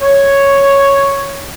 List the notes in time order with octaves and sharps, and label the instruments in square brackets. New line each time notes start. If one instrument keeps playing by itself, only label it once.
[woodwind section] C#5